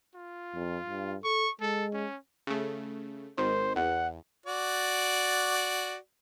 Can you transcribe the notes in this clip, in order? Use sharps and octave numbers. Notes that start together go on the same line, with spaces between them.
F4
F2
G2
A4 C#6
G#3 A4
C#4
C#3 A3
G#1 D#3 C5
E2 F#5
F#4 D5